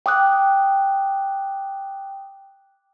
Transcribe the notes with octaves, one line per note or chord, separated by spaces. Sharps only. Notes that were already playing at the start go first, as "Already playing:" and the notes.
G5 D6 D#6 F#6